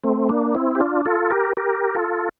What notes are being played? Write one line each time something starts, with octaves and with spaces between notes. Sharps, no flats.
A3 C4
A#3 D4
C4 E4
G4
D4 F4
F4 A4
G4 A#4
G4 A#4
F4 A4